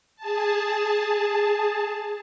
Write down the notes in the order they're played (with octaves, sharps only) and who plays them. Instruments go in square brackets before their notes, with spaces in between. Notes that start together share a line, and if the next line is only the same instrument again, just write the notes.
[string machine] G#4 A5